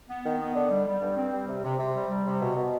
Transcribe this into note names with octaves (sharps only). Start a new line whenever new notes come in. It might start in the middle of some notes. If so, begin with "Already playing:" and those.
B3
D#3
B3
D3
G3
G3
G2
C4
G3
C3
C3
C3
G3
G3
C3
B2
B2